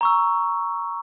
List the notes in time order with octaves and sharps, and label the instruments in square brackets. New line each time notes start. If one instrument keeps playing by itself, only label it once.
[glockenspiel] A#5 C#6 E6